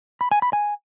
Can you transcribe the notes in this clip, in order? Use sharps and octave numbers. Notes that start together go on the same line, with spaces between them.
B5
G#5
B5
G#5